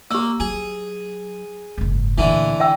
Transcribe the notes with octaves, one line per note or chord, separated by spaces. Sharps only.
A#3 G4 E6
F#3 G#4
F#1 G#2
D2 A#2 D3 E3
E5 G5 E6